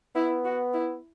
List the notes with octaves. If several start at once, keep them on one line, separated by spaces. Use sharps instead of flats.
B3 E4
F#4
E4